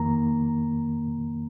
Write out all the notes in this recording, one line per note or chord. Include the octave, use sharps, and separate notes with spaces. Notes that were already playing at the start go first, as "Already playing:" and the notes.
Already playing: F2 D#3 A#3 A#5